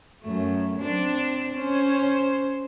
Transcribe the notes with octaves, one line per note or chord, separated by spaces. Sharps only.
F#2 A3
C4 D4
C#4 C5